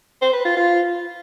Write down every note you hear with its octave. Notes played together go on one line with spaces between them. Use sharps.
C5
B4
F4
F4